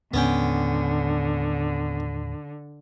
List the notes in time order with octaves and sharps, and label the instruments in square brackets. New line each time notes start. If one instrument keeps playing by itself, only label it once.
[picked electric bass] D#2 A2 G#3 [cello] D3 [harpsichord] B3 C#4 G5